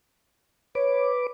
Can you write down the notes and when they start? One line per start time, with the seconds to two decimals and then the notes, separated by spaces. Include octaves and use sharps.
0.75 B4 C#5 D6